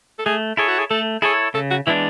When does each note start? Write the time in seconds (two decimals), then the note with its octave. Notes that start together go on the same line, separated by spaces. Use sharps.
0.19 A4
0.26 A3 G#4
0.57 E4 G#4 A4 C#5
0.68 F#4
0.78 G#4
0.90 A3 A4
1.22 E4 G#4 A4 C#5
1.54 C#3 A4
1.70 F#4
1.86 E3 G#3 B3 D4 E4